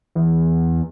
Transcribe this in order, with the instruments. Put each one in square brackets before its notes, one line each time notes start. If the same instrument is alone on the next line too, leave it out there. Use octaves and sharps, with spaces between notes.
[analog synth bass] E2